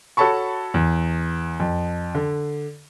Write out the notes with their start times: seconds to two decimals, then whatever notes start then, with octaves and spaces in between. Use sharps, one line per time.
0.17 F#4 A4 C#5 A5 B5 C#6
0.74 E2
1.60 F2
2.15 D3